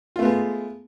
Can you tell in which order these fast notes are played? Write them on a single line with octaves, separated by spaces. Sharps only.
F4 A3 B3 G#3